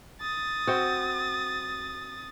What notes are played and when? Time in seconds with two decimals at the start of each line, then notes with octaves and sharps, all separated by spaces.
0.21 D#6 A6
0.67 C4 F#4